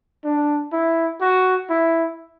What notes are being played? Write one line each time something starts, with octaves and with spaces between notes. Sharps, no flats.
D4
E4
F#4
E4